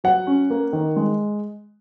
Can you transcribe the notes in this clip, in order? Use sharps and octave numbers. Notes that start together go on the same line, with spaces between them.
F#3 F#5
C#4
A#3
D#3
G#3